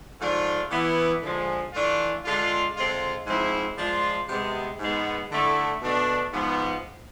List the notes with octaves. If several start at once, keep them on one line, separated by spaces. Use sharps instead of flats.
G#2 F3 A3 D4 F4
E3 B3 E4
D3 F3 G#3
E3 A3 D4 F4
D3 G#3 D4 F4
D3 G#3 C4 F4
G#2 F3 G#3 C4 E4
F3 G#3 D4 F4
C3 G#3 B3
G#2 G#3 B3
D3 A3 E4
B2 A3 D4
G#2 F3 B3